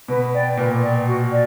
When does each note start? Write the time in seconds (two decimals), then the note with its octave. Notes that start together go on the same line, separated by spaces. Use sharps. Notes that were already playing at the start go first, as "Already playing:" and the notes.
0.08 B2 B4
0.33 D5 G5
0.57 A#2 B4
0.81 D5 G5
1.07 F#4
1.31 D5